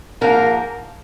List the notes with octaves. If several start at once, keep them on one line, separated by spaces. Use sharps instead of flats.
G#2 F3 A#3 A#4